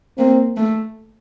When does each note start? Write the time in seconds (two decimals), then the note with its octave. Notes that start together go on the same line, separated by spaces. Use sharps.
0.18 A#3 C4
0.57 A3